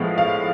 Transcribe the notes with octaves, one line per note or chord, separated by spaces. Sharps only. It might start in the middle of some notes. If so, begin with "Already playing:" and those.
Already playing: A2 F3 G#3 B3 F5
F5